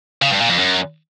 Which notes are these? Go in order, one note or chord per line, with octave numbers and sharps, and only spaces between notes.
C#3
G2
A#2
F2
F#2